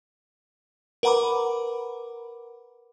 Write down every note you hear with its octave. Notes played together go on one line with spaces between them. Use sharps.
A#4 B4 F#5 A#5 B5 D6